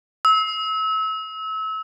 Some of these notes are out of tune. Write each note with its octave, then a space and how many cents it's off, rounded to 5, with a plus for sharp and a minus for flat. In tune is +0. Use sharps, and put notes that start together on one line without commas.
E6 -30